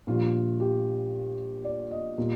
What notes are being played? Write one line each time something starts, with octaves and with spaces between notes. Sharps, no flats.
A#1 A#2 G3 F4
G4
D5
D#5
A#2 G3